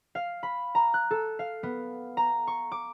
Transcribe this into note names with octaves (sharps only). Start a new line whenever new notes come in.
F5
B5
A#5
F#6
A4
F5
B3
A#5
C#6
D6